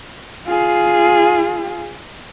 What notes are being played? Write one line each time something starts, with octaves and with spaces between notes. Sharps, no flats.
F4 G#4